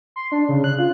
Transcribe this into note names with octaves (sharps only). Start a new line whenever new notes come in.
C6
D4
C#3
F#6
F4